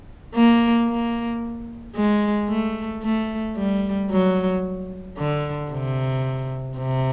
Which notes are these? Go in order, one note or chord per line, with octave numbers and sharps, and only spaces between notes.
A#3
A#3
G#3
A3
A3
G3
F#3
D3
C3
C3